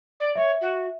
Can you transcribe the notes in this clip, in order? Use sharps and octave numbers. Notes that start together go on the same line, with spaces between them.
D5
C#5 E5
F#4